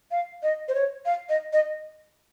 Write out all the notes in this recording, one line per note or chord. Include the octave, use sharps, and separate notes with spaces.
F5
D#5
C5
C#5
F5
D#5
D#5